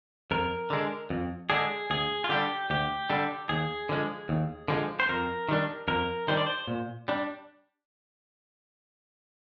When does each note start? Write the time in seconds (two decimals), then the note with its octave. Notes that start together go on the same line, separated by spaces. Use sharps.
0.31 F2 A#4
0.70 D3 G#3 D4
1.10 F2
1.50 D3 G#3 D4 G#4
1.90 D2 G#4
2.24 F4
2.29 D3 G3 D4 G4
2.70 D2 G4
3.10 D3 G3 D4
3.49 D#2 G#4
3.89 D3 F3 G#3
4.29 D#2
4.68 D3 F3 G#3
5.00 C5
5.09 F2 A#4
5.49 D#3 G3 D4
5.88 F2 A#4
6.28 D#3 G3 D4 C5
6.37 D5
6.46 C5
6.68 A#2
7.08 G3 D4